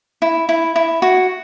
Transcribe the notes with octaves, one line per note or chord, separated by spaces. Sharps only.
E4
E4
E4
F#4